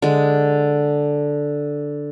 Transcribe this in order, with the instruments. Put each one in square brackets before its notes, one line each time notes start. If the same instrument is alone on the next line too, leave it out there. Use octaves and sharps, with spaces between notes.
[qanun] D3 G#3